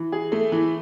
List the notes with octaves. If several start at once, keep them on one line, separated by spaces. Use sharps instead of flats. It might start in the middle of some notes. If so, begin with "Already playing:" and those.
Already playing: E3
G#4
A3
E3